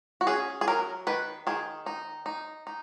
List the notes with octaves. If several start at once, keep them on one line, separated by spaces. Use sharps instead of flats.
F#4
C#4 G#4
G#4
F#3 A#4
D#3 B4
D#3 G#4
D#4
D#4
D#4